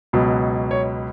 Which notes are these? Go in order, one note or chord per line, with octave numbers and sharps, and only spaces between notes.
C#2 B2 F#3
C#5